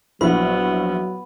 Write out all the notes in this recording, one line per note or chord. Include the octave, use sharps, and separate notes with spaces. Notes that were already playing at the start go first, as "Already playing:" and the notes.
A#1 F#3 B3 E4 B5